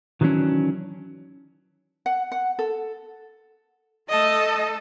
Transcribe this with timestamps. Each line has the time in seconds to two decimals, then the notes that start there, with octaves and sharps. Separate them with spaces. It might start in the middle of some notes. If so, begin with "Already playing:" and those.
0.21 D#3 E3 F#3 A3 C#4 D4
2.06 F#5
2.32 F#5
2.59 A4
4.09 A3 A4 D#5